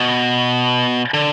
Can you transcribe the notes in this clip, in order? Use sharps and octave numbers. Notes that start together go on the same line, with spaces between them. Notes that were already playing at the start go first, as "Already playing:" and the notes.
Already playing: B2
D3